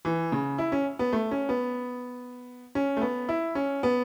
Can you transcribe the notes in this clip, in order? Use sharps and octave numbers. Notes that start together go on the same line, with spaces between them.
E3
C#3
E4
C#4
B3
A3
C#4
B3
C#4
A3
B3
E4
C#4
B3